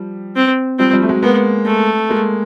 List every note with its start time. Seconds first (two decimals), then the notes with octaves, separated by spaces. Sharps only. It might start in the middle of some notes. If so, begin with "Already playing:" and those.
Already playing: F3 G3
0.36 C4
0.79 F3 G3 C4
0.93 F3 G3
1.02 A3
1.09 F#3 G#3
1.23 G#3 A#3 B3
1.66 A3
2.09 G#3 A#3